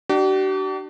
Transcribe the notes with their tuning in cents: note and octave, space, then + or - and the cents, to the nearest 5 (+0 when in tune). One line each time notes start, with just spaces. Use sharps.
D4 +25 G4 -45